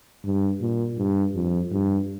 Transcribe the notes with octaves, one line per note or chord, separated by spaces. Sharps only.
G2
A#2
G2
F2
G2